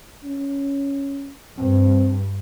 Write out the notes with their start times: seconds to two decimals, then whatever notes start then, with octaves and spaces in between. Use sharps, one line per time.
0.24 C#4
1.59 G2 C4